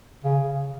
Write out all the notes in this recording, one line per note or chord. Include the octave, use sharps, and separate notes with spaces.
C#3